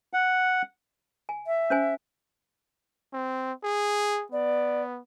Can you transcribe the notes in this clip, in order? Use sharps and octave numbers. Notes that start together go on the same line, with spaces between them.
F#5
G#5
E5
C#4 C5 G#5
C4
G#4
B3 D5